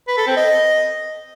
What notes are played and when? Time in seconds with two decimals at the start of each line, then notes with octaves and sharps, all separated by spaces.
0.08 B4
0.18 A4
0.27 C4
0.37 D#5